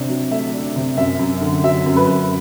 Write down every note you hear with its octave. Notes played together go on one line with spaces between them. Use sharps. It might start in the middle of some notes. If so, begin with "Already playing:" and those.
Already playing: C3 D4
F#3
A3 E5
D4
C3
F#2 E5
F#2
D3
F#3 E5
F#2
B4
F#2